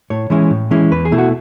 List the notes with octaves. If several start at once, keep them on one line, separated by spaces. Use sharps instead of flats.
A2 C#5
E3 G#3 C#4 E4
A2
E3 G#3 C#4 E4
E2 B4
G#4
B2 A3 E4
F#4